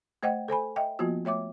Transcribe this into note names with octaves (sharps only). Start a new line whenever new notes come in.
A3 C5 D#5 F#5 G5
A4 C5 G#5 B5
D#5 E5 G5
F3 A#3 B3 F4 F#4
A3 C#5 E5 D6